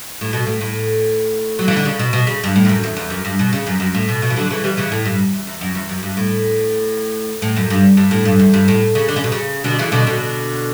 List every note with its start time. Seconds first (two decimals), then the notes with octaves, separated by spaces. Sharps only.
0.21 A2
0.33 B2
0.47 A2
0.61 A2
1.59 F#3
1.68 E3
1.77 D3
1.85 C#3
1.99 B2
2.13 B2
2.27 C#3
2.44 G2
2.56 A2
2.65 E2
2.69 F#2
2.84 E2
2.96 E2
3.10 F#2
3.25 G2
3.39 B2
3.53 C#3
3.67 F#2
3.80 F#2
3.94 A2
4.08 B2
4.22 B2
4.30 E3
4.36 D3 F#3
4.50 C#3 E3
4.64 E3 G3
4.77 C#3 E3
4.92 A2
5.05 G2
5.33 E2
5.47 E2
5.61 F#2
5.75 E2
5.89 F#2
6.03 G2
6.17 A2
7.42 A2
7.56 F#2
7.70 G2
7.97 G2
8.11 A2
8.25 G2
8.39 E2
8.54 G2
8.68 A2
8.95 C#3
9.09 D3
9.16 C#3
9.24 B2
9.32 C#3
9.64 B2 D3
9.79 C#3 E3
9.92 B2 D3
10.07 B2 D3